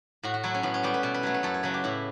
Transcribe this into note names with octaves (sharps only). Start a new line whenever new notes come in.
A2 F#4
F#4
F#3 A3 E4
C#4
A2 B3
C#4
G3 B3 G4
B4
B2
B4
F#3 A3 C#5
B4
F#2 A4
C#5
C#3 F#3 B4
G4
A2 E4